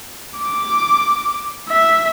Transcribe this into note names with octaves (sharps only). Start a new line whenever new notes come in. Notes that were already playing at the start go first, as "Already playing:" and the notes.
D6
E5